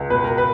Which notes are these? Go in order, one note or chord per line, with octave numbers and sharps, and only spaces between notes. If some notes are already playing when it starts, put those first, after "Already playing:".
Already playing: C#2
B2 B4
A#4
B4